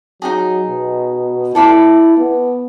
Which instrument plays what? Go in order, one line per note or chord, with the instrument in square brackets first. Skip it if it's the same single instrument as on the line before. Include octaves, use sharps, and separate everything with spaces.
[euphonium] F#3 [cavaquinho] D#4 F#4 G#4
[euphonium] B2
[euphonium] E4 [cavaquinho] A4 D5 B5
[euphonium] B3